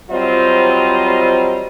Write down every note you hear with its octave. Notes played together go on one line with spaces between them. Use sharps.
F#3 G3 C4 F4 C5 D#5